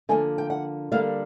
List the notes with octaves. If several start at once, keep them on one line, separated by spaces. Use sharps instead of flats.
D3 F3 A#3 G#5
G5
F#5
D3 G3 A#3 F5